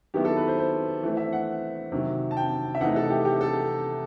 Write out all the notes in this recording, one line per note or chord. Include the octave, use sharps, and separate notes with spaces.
D#3 F#3 B3 E4 G4
A4
B4
C5
C5
E3 A3 C4
E5
F#5
C3 D#3 F#3
A5
G5
E5
C3 E3 A3 D#4 F#5
A4
G4
G4
A4